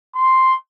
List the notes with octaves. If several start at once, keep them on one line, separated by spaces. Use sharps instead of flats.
C6